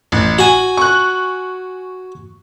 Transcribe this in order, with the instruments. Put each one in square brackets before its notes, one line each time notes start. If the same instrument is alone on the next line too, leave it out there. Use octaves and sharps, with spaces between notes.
[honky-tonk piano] A1
[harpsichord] F#4 G#5 [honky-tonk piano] F#7
[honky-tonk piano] C#6 F#6